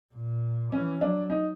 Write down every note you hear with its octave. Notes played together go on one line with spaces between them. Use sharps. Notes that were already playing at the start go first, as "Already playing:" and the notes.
A#2
E3 C#4
F#3 D4
D#4